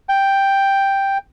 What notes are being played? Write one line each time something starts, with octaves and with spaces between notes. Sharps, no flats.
G5